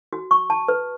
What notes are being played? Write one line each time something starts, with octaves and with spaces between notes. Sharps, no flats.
F#4
C#6
A5
B4